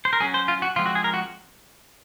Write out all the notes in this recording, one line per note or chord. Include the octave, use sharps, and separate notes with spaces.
C5
A#4
F#3 C#4 G#4
C5
F4
F#4
F3 G#3 C4 F4
F#4
G#4
A#4
F#4